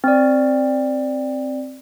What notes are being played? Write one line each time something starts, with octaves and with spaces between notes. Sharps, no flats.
C4 D5